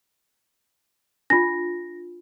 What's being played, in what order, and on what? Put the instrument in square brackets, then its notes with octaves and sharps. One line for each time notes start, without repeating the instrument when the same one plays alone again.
[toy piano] D4 F4 [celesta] A#6